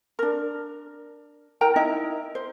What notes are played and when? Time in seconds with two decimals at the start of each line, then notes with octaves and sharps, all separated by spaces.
0.19 D4 A#4
1.61 E4 A#4 G5 A#5
1.76 D#4 E4 D#5 A#5
2.35 C5